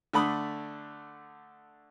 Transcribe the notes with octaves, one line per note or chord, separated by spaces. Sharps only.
D3 A3 D4 B5 D#6